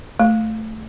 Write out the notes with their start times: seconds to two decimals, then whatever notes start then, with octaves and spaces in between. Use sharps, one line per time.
0.20 A3